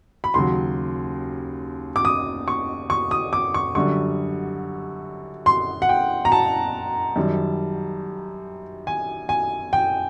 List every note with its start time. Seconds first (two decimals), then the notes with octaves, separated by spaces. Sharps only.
0.24 B5
0.34 D#2 C#3 F#3 C6
1.96 D6
2.05 D#6
2.48 C#6
2.90 C#6
3.11 D#6
3.33 D6
3.54 C#6
3.75 F#2 D3 G3 C#6
5.46 C6
5.82 F#5
5.89 G5
6.25 A#5
6.32 A5
7.16 F#2 D#3 G3
8.87 G#5
9.29 G#5
9.73 G5